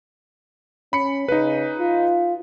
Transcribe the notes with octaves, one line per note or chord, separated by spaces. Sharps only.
C#4 B5 C#7
C#3 D#4 B4
F4